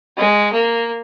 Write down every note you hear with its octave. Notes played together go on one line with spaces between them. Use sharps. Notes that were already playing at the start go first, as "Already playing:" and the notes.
G#3
A#3